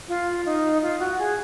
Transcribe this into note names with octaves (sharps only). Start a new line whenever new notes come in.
F4
D#4
F4
F#4
G#4